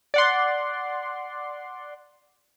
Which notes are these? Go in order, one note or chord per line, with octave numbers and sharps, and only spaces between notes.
D5 F#5 C6